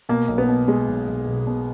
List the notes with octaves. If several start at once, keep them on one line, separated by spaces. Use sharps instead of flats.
B2 A#3
B1
B3
B2
B2 G#3
B1
B1
B1
B2